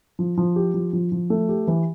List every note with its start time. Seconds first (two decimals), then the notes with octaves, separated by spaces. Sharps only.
0.19 F3
0.38 F3
0.56 G4
0.74 F3
0.93 F3
1.12 F3
1.30 A3
1.49 G4
1.67 E3